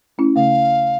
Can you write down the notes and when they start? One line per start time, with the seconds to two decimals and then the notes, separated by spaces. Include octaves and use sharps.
0.18 A3 C#4 E4
0.36 C#3 A3 F5